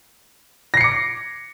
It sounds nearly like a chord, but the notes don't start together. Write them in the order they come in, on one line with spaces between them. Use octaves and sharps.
A#6 C7 C#7 D6